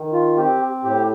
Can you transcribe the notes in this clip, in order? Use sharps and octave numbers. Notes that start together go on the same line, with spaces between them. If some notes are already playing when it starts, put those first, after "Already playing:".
Already playing: D#3
F4
C4 G4
A2 G4